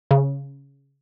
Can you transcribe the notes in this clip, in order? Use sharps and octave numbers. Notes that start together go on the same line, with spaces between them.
C#3